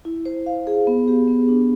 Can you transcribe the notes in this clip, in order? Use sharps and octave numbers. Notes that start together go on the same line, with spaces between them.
E4
C5
F5
G#4
B3
G4
B3
D4